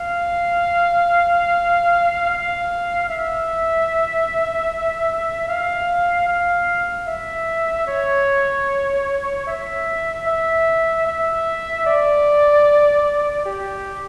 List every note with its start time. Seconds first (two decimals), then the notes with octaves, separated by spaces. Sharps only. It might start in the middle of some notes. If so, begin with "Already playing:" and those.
Already playing: F5
2.30 F5
3.09 E5
5.49 F5
6.28 F5
7.08 E5
7.87 C#5
9.47 E5
10.27 E5
11.07 E5
11.86 D5
13.46 G4